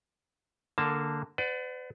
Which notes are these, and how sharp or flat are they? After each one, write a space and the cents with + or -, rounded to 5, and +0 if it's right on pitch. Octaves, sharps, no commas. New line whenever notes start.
D3 +0 A#3 -15 A5 +0
B4 +45 D5 +0 F#5 +0